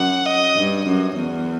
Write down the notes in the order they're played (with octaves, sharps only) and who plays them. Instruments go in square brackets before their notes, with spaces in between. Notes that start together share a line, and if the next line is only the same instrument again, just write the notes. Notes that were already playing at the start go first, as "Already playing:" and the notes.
Already playing: [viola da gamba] F#2 [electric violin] F#5
[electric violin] D#5
[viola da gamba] G2
F#2
E2